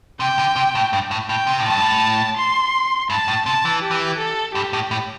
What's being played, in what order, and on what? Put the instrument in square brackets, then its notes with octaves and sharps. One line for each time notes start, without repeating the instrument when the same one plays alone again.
[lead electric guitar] C3 [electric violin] G5
[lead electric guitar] D3
C3
A2
G2
A2
[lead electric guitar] A2 [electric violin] G5
[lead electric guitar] C3
A2
[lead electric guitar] G2 [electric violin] A5
[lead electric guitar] A2
[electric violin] C6
[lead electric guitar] G2 [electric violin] A5
[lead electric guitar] A2
[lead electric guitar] C3 [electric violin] A5
[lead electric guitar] E3
[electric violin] G4
[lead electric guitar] E3
[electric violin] A4
[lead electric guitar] G2 [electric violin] G4
[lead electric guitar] A2
A2